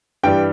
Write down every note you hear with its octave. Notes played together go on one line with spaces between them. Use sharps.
G2 E3 G3 G5